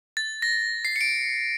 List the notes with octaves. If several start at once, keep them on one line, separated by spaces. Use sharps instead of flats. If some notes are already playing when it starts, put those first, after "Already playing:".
A6
A#6
C7
C#7
D7